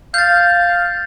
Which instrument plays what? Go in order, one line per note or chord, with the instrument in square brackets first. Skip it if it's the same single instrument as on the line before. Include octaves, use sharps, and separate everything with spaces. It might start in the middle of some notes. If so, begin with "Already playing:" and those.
[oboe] F5 [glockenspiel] G6 A6